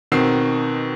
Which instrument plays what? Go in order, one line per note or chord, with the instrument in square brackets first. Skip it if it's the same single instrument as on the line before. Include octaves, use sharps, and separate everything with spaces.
[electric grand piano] B2 D#3 C4 F#5 E6 C7